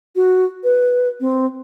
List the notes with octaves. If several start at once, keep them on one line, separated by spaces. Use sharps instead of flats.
F#4
B4
C4